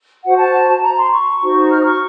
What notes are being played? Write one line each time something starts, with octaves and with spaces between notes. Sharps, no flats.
F#4 C5 F#5
A5
A#5
C6
C#6
D#4 F#4 C5
F6
D#6
C#6